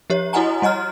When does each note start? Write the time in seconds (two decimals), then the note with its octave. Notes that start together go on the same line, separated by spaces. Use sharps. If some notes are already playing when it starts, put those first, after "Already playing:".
0.10 F3 G4 C#5
0.33 E4 F#4 D#5 F#5 G#5 A#5
0.62 G3 C#5 D#5 A#5 F6